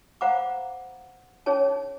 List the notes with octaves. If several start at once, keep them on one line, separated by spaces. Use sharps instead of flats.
C5 F5 F#5 A#5 B5 D6
C#4 D#4 G#4 C#5 A5